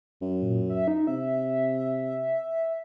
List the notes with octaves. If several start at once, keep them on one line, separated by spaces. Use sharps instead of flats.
F#2
A#2
E5
D#4
C3 E5